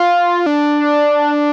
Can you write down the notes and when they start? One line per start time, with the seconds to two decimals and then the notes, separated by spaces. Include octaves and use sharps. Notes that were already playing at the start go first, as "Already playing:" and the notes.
Already playing: F4
0.46 D4